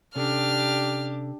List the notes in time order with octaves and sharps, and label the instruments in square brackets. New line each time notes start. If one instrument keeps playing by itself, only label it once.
[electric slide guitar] C3 C#4 A4 [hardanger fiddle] D4 G4 [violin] F6